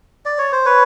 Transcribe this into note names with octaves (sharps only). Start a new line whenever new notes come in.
D5
C#5
C5
B4 C#5